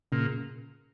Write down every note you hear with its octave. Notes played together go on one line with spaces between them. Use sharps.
A#2 C#3